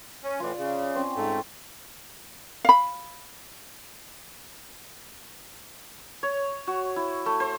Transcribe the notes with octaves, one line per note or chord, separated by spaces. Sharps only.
C#4
A2 E3 F4 D5
C#3
C4 C#4 C5
G#2 A3
F5 B5
C#5
F#4
E4
A3
C5